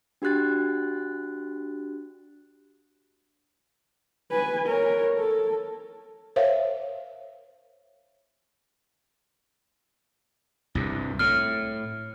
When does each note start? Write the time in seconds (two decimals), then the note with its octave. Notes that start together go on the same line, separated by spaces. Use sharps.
0.22 D4 F#4 G4 F#6 A6
4.32 B4 G#5
4.66 A#4 C#5
5.18 A4
6.36 A#4 C5 C#5 E5 F5
10.75 C2 G2
11.19 A2 F6